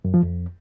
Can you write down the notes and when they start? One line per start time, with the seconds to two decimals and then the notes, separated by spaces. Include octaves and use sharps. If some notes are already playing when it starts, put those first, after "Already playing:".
0.05 F#2
0.14 F3
0.23 F2